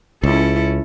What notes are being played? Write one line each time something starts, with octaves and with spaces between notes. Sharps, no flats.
C#2 C#4 E4 A4